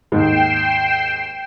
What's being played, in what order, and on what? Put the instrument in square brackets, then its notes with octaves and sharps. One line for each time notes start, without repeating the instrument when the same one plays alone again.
[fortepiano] D#2 G#2 [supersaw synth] G5 C7 E7